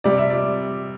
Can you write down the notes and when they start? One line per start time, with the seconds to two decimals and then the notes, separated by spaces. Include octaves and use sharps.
0.04 C3 G3 D5
0.18 E5
0.30 D5